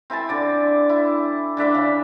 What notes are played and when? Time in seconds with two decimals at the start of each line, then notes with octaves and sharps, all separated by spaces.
0.10 C4 E4 G#5 A5
0.29 D3 D5
0.89 E4
1.57 D3 D4 E5 D6
1.75 C#3